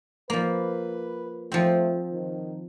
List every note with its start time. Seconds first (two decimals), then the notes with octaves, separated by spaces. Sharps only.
0.30 F3 A#3 B4
1.52 F3 A3 C4
2.12 D#3